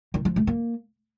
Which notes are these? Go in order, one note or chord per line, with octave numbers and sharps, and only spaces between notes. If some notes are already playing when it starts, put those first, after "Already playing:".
D#3
F3
A3
A#3